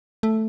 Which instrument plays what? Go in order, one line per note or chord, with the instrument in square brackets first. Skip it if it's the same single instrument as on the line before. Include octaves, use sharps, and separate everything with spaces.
[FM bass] A3